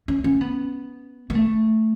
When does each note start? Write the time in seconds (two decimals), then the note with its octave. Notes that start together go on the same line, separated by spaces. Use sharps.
0.08 C#4
0.24 C#4
0.41 B3
1.30 B3
1.35 A3